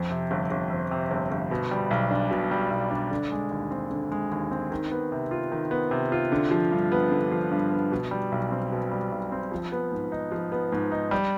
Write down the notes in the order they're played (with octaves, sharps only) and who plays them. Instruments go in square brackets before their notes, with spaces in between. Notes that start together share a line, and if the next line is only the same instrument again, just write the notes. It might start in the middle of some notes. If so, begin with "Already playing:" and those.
Already playing: [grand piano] F2
C3
G1
G1
F2
C3
G1
G1
B2
G3
B1
D4
B2
G3
B1
D4
D3
G#3
D#2
C4
D3
G#3
D#2
C4
D#3
B3
C3
F4
D#3
B3
C3
F4
D3
F3
G2
B3
D3
F3
G2
B3
B2
G3
B1
C4
B2
G3
B1
C4
F3
B3
G#2
D#4
F3
B3
G#2
D#4
G3